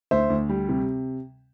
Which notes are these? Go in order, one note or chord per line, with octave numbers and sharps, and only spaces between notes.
D2 C5 E5
D2
G3
C3